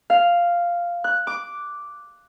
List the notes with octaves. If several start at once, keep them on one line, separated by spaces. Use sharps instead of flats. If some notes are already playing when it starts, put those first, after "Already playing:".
F5
F#6
D6